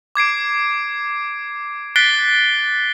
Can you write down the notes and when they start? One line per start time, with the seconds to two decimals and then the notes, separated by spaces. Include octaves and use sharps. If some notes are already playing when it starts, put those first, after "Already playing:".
0.15 D6 G#6 C7 D7
1.96 F#6 A6 B6 C7 D7 G7